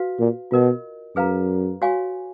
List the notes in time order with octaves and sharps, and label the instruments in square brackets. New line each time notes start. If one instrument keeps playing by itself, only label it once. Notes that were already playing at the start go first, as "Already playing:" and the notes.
Already playing: [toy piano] F#4 B4 F5
[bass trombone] A#2
[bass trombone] B2 [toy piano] F4 A#4 D#5
[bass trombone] F#2 [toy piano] G#4 B4 F5 A#5
[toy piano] F#4 C#5 F5 G#5 C#6